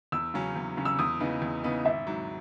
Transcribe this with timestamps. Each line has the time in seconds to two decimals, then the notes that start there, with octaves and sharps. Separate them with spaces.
0.12 E2 E6
0.34 C#3 F#3 C#4
0.56 E2
0.77 C#3 F#3 C#4
0.85 E6
0.99 E2 D#6
1.20 C#3 E3 B3 D#4
1.42 E2
1.63 C#3 E3 B3 D#4
1.85 G#1 E5
2.07 G#2 F#3